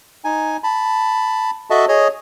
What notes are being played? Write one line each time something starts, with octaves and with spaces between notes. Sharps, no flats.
D#4 G#5
A5 B5
F#4 A4 D#5 E5 A5
G#4 C#5 D#5